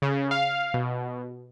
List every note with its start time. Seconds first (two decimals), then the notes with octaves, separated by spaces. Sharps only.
0.02 C#3
0.31 F5
0.74 B2